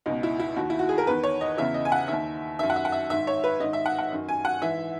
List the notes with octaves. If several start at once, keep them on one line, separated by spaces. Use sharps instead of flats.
C#2 B2 D#4
E4
E4
D#2 D#3 F#4
E4
F#4
G#4
A#4
E2 D#3 B4
C#5
D#5
E2 C#3 E3 E5
D#5
G#5
F#5
D#2 D#3 E5
F#2 D#3 E5
F#5
E5
F#5
E5
G#2 D#3 E5
C#5
B4
G#2 D#3 D#5
E5
F#5
F#5
F#2 D#3
G#5
F#5
G#2 E3 E5